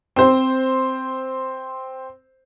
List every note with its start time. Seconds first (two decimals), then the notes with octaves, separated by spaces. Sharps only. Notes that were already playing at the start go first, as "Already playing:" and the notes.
0.16 C4 C5